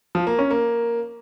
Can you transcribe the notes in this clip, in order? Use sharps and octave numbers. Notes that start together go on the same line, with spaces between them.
F3
A#3
C#4
A#3